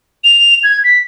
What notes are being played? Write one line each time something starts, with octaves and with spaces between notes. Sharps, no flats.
F7
G#6
B6